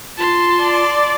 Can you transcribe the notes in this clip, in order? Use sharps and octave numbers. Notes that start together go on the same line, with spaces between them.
F4 A5 C6
D5